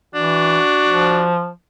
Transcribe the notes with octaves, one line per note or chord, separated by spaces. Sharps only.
E3 D4 F#4
F3